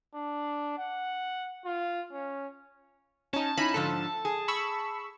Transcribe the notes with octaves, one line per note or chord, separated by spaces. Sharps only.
D4
F#5
F4
C#4
C#4 D#4 A5
C#4 D#4 E4 B5
G#2 D3 F3 A4
G#4
B5 C#6 E6